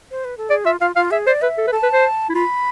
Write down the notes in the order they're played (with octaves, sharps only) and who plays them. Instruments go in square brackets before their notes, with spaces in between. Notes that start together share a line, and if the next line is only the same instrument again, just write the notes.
[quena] C5
B4
A4
[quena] G#4 [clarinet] D5
[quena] F4 [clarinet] E5
[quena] F4 [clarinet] F5
[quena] F4 [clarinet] F5
[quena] G#4 [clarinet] E5
[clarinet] C5 [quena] D5
[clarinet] B4 [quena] E5
[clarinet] A4
B4
[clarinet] A4 [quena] A5
[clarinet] B4
C5
E4
[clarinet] F4 [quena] B5